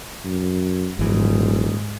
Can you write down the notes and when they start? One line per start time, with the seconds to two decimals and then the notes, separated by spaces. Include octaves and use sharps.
0.25 F#2
0.99 D#1 G#1 G#2 E3 F#3